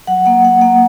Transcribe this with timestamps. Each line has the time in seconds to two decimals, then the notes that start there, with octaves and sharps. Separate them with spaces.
0.07 F#3 F#5
0.26 A#3 F#5
0.44 A#3 F#5
0.61 A#3 F#5